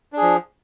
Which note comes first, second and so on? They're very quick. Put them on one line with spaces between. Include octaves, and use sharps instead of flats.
D4 G#4 F3